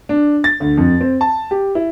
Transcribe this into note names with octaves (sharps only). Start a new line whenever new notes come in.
D4
A6
D2
F2
C4
A5
G4
E4